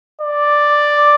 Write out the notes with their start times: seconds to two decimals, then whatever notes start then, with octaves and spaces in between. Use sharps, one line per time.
0.22 D5